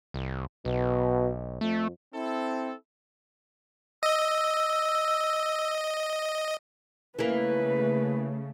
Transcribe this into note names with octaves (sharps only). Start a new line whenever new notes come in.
C2
B1 B2
F2 A3
C4 E4 A4
D#5 E6
C#3 E3 A3 A#3 B4